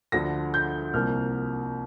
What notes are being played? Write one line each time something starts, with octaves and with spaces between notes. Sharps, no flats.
D2 D3 F3 A#6
G6
C2 C3 F3 A#3 F6